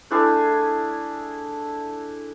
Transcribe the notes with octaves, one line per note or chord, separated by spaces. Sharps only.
A3 D4 E4 G#4